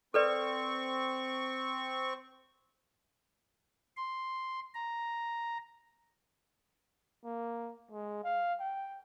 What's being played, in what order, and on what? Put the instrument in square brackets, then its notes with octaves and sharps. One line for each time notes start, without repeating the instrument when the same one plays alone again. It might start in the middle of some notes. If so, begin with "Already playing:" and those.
[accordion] C4 C#6 [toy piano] A4 B4 D5
[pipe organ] C6
A#5
[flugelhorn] A#3
G#3
F5
G5